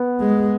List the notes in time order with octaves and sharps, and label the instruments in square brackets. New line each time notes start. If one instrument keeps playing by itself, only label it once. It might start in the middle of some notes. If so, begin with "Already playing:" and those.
Already playing: [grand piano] B3
[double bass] G#3